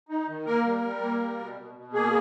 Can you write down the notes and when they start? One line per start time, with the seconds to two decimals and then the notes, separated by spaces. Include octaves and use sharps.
0.09 D#4
0.28 D#3
0.45 A#3 A#4
0.65 G3
0.83 G3
1.02 A#3
1.20 G3
1.38 B2
1.57 B2
1.75 B2
1.94 A#3 G#4